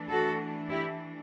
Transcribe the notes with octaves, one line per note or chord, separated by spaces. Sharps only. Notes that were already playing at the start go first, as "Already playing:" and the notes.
Already playing: E3 A3 D4
F#4 A4
E4 G4